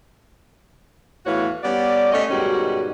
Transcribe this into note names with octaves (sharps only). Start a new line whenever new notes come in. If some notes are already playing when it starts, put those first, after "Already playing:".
E2 A2 E3 F#4 C#5 F5
G3 B3 C#4 D5
A3 C#4 C#5 D#5
G#2 B2 D#3 G3 C#4 F#4